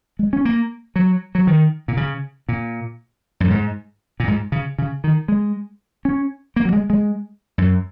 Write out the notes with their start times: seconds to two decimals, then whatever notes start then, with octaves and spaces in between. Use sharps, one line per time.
0.19 G#3
0.33 C#4
0.45 A#3
0.96 F#3
1.35 F#3
1.47 D#3
1.88 A#2
1.97 C#3
2.49 A#2
3.40 F#2
3.50 G#2
4.20 A#2
4.28 G#2
4.52 C#3
4.78 C#3
5.04 D#3
5.28 G#3
6.05 C#4
6.56 A#3
6.65 F#3
6.73 G#3
6.90 G#3
7.58 F#2